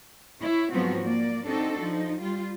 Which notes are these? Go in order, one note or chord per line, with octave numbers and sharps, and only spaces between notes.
E4 C#5
G#2 F3 F#3 B3 C4 F#4
A#3 D5
C4 D4 D#4 F#4 A4
F3 D#4
G3 F4